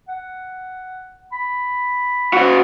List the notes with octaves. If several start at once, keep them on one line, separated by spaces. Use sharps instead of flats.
F#5
B5
C#3 F#4